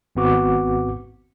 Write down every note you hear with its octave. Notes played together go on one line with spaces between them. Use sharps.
G#1 G#2 B3 C4 F#4 D6